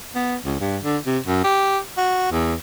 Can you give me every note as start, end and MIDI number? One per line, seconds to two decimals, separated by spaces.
0.15 0.36 59
0.45 0.57 37
0.60 0.78 43
0.83 0.97 50
1.06 1.19 48
1.26 1.43 42
1.44 1.78 67
1.97 2.28 66
2.31 2.54 40